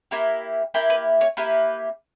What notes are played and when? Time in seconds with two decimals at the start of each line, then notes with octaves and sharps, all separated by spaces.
0.11 A#3 E4 G4
0.74 A#3 E4 G4
0.90 B4
1.21 C#5
1.37 A#3 E4 G4 B4